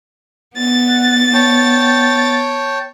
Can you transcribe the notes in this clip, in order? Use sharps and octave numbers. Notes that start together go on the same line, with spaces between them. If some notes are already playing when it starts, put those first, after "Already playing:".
B3 A6
F#5
C#5 G5 A5